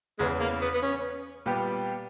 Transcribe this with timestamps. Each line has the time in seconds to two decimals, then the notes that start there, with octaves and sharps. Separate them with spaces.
0.19 E2 C#3 E3 G#3
0.40 A#3
0.62 B3
0.74 B3
0.83 C#4
1.46 A#2 G3 B3 G4